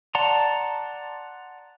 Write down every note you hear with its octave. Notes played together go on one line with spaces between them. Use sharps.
D5 F#5 A5 A#5 C6